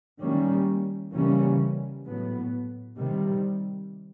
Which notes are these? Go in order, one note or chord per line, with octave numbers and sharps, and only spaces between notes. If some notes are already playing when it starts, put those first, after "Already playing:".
D#3 G3 A#3 C#4
C#3 E3 G3 A#3 C#4
A2 F#3 B3
C3 D#3 G3